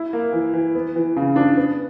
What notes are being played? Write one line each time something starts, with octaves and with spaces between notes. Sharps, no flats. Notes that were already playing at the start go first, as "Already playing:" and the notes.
Already playing: E4
A#3
E3
E3
B3
E3
C#3
D4
B3